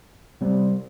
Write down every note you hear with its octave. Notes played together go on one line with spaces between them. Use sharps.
C3 G3 C4